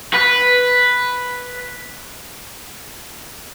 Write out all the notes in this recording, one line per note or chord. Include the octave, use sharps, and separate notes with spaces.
B4